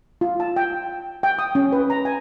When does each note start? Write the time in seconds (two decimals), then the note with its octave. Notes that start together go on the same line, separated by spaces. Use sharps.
0.21 F4
0.40 A5
0.56 G5
1.23 G5
1.39 D#6
1.55 C#4
1.72 B4
1.90 A#5
2.05 G#5